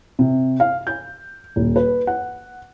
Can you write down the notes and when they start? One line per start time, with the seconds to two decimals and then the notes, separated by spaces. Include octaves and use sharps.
0.19 C3
0.60 F5
0.87 G6
1.56 D#1
1.76 B4
2.07 F#5